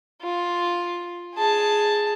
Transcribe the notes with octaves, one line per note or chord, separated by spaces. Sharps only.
F4
G#4 A5